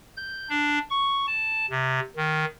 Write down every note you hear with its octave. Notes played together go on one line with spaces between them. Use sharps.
G6
D4
C#6
A5
C3
D#3